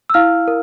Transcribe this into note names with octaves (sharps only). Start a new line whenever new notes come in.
E6
E4 F5 F6
A#4